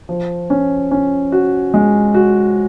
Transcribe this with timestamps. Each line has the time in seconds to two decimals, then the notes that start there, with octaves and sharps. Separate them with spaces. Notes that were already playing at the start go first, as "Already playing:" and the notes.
0.09 F3
0.50 C#4
0.91 C#4
1.32 F#4
1.74 G#3
2.14 F#4